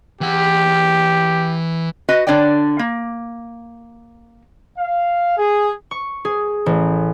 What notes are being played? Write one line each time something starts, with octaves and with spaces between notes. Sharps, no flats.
E3 G4 F#5
F#4 B4 D#5
D3 D4 C#5 D5 G5
A#3
F5
G#4
C#6
G#4
A1